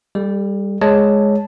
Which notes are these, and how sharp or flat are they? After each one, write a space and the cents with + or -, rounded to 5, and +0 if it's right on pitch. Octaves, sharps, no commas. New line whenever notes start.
G3 +20 A4 -20
G#3 +0 C#5 +0 A5 +0